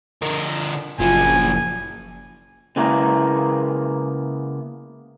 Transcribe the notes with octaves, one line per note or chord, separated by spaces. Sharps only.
D3 A#4
F#1 A#2 F3 G#5
C#3 G#3 A#3 B3 E4 A#4